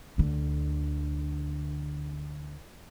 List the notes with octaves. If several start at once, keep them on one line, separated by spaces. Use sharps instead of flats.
D2 D3